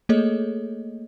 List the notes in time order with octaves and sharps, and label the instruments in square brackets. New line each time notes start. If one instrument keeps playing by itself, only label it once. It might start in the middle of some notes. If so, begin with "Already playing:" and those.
[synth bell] A3 A#3 G#4 A4 C#5 D#5